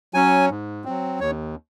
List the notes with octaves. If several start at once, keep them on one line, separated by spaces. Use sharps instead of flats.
F#3 C#4 G#5
G#2
F#3 C4
D#2 C#5